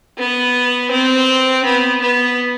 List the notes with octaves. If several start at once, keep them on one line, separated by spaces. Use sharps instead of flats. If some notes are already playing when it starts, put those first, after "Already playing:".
B3
C4
B3
B3